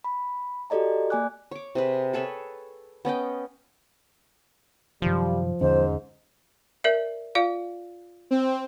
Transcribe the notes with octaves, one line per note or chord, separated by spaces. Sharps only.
B5
F#4 G4 A4 D5 D#5 A#5
A#3 D5 G#5 D6 F#6
C#5 D6
C3 G#4 B4
G#4 A4 B4 C#5
B3 C#4 D#5 G5
F#2 C3 D#3 F3 G3
E2 G#2 D3 C#4 C5
A#4 D5 E5
F4 D5 F5
C4